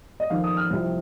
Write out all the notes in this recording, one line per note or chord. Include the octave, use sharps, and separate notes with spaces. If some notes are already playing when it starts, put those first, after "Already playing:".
D#5
F2 D#3 F5
D#6
F6
C2 C3 F3